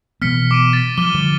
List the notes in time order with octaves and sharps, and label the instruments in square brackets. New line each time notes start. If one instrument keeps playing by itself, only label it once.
[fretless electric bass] B2 E3 B3 [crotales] F6 B6 C#7
[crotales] D6 D7 D#7
A6 B6
[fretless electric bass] F3 [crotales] D6 D#7 G7
[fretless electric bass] D3 F3 G3